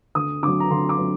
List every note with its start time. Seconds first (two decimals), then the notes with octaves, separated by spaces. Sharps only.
0.15 D2 D#6
0.43 D3 F#3 D6
0.60 A#5
0.70 D2 C6
0.89 D6
0.99 F#3